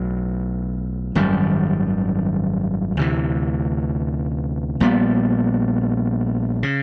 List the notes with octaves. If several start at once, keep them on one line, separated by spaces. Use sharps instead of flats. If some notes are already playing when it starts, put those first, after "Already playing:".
Already playing: B1 A2 F#3
G#1 F#2 D#3 G3
D2 C3 E3
A#1 A#2 G3 B3
C#3